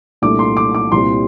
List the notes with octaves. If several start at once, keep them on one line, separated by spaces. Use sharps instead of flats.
C2 A#2 A3 D4 D6
C6
D6
D6
C2 A#2 G3 C4 C6